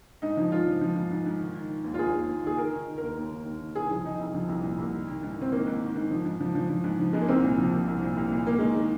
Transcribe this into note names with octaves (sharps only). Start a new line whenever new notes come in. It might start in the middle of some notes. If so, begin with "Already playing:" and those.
G#2 D#4
F3
G#2 F4
F3
F3
G#2
G#2
G#2
D#3
D#3
D#3
D#2
F4
D#2 G#4
D#2
D#2
D#3 G#4
D#3 A#4
D#3
D#3
D#2 A#4
D#2
D#3
D#2
D#3
C2 G#4
F3
F3 D#4
C2
F3
C2
A#2
C2
D#3
D#3
G#2
D#3 C4
D#3 A#3
G#2
D#3
G#2
F3
G#2
F3
F3
F3
G#2
F3
G#2 G#3
A#3
C2 C4
A#2
F3
C2
C2
A#2
C2
A#2
D#3 A#3
D#3 G#3
D#3